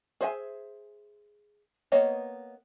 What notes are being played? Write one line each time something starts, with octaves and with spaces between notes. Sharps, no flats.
G#4 C5 E5 F#5 G#5
A#3 B3 C#5 D#5